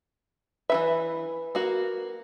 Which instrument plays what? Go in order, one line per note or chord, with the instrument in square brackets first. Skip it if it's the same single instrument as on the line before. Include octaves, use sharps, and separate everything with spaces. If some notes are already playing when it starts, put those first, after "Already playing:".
[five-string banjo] E3 D#4 E5 [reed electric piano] B4
[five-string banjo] A#3 F#4